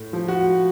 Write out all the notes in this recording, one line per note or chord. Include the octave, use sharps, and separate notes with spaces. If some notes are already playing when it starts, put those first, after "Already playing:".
Already playing: A2
F3
F#4